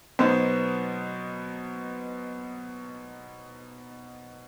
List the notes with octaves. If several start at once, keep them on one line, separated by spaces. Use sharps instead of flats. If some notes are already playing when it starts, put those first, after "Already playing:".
B2 F#3 B3 D#4 C5